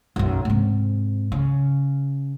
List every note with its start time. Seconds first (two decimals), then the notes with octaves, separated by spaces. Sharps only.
0.16 B1 F#2
0.45 G#2 C3
1.32 C#3